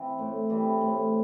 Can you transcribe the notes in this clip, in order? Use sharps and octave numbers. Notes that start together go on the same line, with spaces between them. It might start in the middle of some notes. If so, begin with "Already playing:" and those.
Already playing: E3 C4
A2
E3 G3 C4
A2